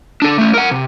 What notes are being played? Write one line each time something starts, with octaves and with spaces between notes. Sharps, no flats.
D4 A4
A3 C#4
A#4 F#5
C3